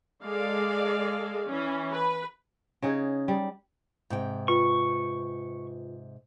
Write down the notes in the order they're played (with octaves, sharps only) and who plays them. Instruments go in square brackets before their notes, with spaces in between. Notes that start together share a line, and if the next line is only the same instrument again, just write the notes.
[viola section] G#3 A4 D5 F5
E3 C#4
B4
[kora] C#3 D#4 G#4
G3
[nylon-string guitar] G#2 C3 G5
[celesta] F4 B4 [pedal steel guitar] C#6